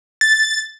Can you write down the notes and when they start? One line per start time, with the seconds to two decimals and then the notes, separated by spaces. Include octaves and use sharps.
0.21 A6